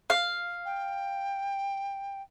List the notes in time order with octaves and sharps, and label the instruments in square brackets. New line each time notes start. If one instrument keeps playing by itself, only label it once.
[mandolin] F5
[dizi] G5